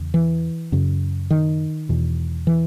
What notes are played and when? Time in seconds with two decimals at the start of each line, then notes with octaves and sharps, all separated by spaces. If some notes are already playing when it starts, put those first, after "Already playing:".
Already playing: E2 C#3
0.14 E3
0.72 F#2 C#3
1.31 D#3
1.89 E2 B2
2.47 E3